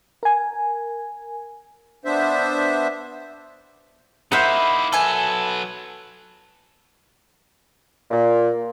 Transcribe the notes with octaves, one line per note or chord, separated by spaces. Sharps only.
A#4 G#5
B3 D4 C5 E5
A#3 D#4 E4 C5 E5 F#5 B5
F#3 A4 B4 G#5
A#2